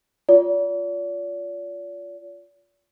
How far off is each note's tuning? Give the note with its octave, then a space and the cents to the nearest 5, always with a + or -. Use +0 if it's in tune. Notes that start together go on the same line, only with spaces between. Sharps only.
F4 +0 D5 -40